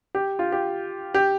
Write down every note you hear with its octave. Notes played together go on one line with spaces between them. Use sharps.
G4
F4
G4
G4